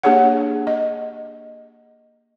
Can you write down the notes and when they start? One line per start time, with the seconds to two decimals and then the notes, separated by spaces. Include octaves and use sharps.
0.03 A#3 D4 G4 G#4 C#5 F#5
0.67 D#5